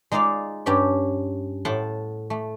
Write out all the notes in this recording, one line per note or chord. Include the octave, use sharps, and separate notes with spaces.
G#3 D#4 F4 D5 F5
G2 C#4 G4 G5
A2 F#5 G5 A5 C6
A3